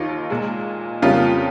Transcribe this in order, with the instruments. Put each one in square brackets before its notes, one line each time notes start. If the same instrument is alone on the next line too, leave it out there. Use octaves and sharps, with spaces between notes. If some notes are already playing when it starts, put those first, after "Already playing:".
Already playing: [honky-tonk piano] D#2 D#3 A#3 D#4 F4
A#2 G#3
F2 C#3 G3 A#3 F4